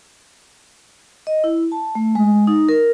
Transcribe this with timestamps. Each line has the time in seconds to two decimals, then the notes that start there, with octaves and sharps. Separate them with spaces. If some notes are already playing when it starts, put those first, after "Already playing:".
1.27 D#5
1.44 E4
1.72 A5
1.95 A3
2.15 G#3
2.47 D#4
2.69 A#4